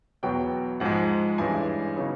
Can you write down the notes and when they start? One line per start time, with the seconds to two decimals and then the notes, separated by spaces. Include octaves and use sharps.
0.23 E2 B2 F#3 B3 G5
0.80 G#2 F3 G#3 F#5
1.38 G2 E3 G#3 C#4 G#5
1.96 C#3 F#3 B3 D#4